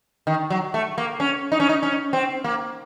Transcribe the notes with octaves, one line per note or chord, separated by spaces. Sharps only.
D#3
F#3
A3
A#3
C#4
D#4
C#4
D#4
C#4
C4
A#3